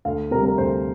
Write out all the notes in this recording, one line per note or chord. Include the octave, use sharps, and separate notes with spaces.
D2 F5
C3 G3 A#4
A#4
D2 C5